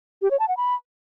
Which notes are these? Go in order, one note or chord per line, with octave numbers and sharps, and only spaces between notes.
G4
C#5
A5
F#5
B5